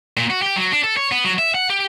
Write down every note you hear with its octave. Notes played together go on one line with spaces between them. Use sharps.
A#2
F#4
G4
F#3
D4
A4
C#5
B3
F#3
E5
F#5
G4